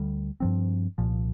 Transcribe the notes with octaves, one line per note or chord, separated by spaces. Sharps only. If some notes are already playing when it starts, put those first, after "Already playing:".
Already playing: D2 D3 G3
G2 F3 C4
C2 A#2 F3